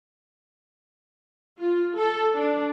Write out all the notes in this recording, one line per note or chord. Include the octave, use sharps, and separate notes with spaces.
F4
A4
D4